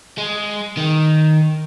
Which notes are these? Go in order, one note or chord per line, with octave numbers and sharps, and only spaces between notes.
G#3
D#3